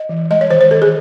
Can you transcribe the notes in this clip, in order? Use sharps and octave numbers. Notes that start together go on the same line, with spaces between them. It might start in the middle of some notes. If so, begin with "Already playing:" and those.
Already playing: D#5
E3
G#3 D#5
C#5
D#3 C5
C5
D#3 A4
G#4